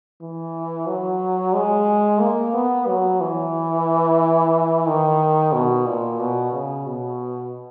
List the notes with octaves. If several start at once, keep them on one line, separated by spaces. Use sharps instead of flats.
E3
F#3
G#3
A#3
B3
F#3
E3
D#3
B2
A#2
B2
C#3
B2